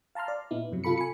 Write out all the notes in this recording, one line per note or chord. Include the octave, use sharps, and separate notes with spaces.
F5 A5 A#5 C6 F6
D5
A#2 B3 D#4 E4
G2 C3 F#3
C3 F4 A4 B5 C#7
G#5 B5 C#7